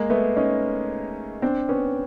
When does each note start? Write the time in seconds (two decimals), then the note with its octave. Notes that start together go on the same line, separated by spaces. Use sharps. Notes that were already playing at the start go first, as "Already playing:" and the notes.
Already playing: G#3 A#3
0.10 A3 B3
0.36 C#4 D#4
1.42 C4 D4
1.69 B3 C#4